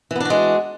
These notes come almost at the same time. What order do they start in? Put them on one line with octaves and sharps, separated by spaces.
E3 B3 D4 F#4 G#3